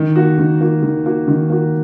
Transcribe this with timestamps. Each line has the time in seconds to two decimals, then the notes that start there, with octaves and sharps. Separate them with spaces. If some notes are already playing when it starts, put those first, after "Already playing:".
Already playing: D#3
0.16 A#3 F#4
0.39 D#3
0.61 A#3 F#4
0.83 D#3
1.06 A#3 F#4
1.28 D#3
1.50 A#3 F#4